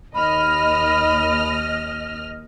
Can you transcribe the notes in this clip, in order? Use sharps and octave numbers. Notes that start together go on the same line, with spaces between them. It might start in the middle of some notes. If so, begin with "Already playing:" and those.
D#2 D#5 B5 F6